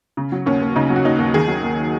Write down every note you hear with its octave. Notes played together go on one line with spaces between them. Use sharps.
C#3
F#3
D#2 C#4
D#2
C#3 D#4
F#3
F#4
D#2 D#4
D#2
D#3 G#4
F#3
D#2